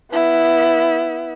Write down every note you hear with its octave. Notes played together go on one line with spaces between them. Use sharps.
B3 E4